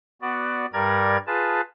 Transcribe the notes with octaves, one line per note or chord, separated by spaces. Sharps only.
B3 F#4 D5
G2 G3 A#4 D5 A#5 G#6
F4 G#4 B4 A5